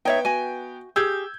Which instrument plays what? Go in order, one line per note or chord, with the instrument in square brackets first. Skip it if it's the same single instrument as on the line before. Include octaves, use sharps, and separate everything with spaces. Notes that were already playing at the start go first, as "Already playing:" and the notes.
[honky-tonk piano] B3 G5 [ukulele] D#4 C#5 E5
[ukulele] F#4 G#5
[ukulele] G4 G#4 [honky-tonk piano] E6 G6 G#6